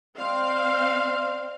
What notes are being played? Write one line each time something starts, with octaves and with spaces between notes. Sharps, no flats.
C4 D5 D#5 F5 C6